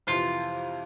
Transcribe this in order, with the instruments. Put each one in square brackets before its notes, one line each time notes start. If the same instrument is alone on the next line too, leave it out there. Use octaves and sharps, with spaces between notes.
[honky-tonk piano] F2 C3 E3 [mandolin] F4